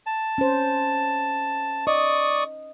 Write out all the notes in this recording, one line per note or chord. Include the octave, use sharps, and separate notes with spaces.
A5
C#4 C5
D5 D#5 C#6 D#6